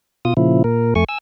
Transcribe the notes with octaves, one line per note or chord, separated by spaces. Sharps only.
B2 F4 D#6
A#2 C#3 F3 E4
A#2 A#4
F2 A3 G#5 C#6
G#5 E6